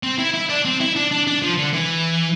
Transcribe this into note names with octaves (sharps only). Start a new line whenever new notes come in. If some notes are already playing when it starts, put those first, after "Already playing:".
C4
E4
E4
D4
C4
E4
D4
D4
D4
F3
D3
E3